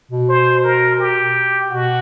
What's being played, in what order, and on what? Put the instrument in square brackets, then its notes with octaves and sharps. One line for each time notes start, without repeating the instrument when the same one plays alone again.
[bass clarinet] B2
[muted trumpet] C5
A#4
G4
[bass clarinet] B2 [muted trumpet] F#4